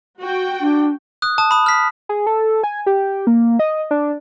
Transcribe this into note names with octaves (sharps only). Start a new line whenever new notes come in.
F#4 G5
D4
D#6 F#6
A5 D#6
B5 D#6
F6 B6
G#4
A4
G#5
G4
A#3
D#5
D4